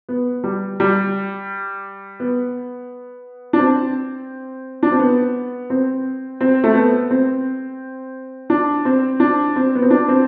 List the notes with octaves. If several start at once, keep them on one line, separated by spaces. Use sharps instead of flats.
B3
G3
G3
B3
D4
C4
D4
C4
B3
C4
C4
A3
B3
C4
D4
C4
D4
C4
B3
C4
D4
C4